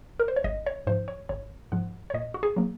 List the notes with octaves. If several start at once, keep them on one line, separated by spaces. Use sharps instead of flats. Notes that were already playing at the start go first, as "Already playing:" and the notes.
A#4
C5
C#5
G#1 D#5
C#5
G#2 F3 C5
C#5
G#1 C#5
G#2 F3 F#5
C#5
A#2 D#5
F#4
G#4
F#3 A#3